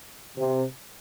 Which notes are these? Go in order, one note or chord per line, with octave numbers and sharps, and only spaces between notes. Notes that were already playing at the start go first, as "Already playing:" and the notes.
C3